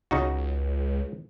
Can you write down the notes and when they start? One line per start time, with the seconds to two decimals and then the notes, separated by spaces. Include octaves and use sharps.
0.11 C#2 C#3 D#4 F#4